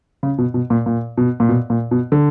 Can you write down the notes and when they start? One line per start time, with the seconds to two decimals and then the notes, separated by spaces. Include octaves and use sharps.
0.23 C#3
0.38 B2
0.54 B2
0.70 A#2
0.86 A#2
1.17 B2
1.40 A#2
1.49 B2
1.70 A#2
1.91 B2
2.12 D3